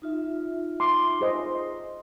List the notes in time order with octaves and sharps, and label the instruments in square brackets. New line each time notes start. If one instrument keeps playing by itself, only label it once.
[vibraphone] D#4 F4 E5
[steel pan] C6 D6
G#4 C5 D#5